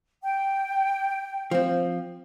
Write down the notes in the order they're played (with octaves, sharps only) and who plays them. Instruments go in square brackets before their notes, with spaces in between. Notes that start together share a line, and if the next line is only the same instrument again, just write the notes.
[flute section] G5
[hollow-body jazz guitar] F3 C4